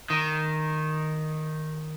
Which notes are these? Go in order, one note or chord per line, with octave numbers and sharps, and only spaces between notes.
D#3